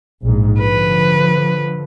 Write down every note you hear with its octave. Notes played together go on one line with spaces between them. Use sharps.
A#1 G#2
D3 F3 B4